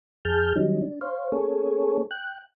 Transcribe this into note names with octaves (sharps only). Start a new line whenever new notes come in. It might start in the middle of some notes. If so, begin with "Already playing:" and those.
F2 G#4 A5 F6 G6
D#3 F#3 G3 C#4 D#4
D4
C5 C#5 F5
A#3 C#4 G#4 A4 C#5
G5 F#6